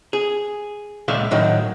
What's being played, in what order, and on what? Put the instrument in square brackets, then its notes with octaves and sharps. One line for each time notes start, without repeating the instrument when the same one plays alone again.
[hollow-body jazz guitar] G#4
C#2 A#2 E5 F5
A2 D#3 F#3